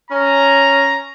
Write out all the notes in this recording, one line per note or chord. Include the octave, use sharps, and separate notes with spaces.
C#4 A#5